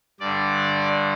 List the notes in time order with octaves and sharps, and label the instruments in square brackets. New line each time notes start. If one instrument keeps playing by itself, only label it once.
[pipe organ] G2 D3 D5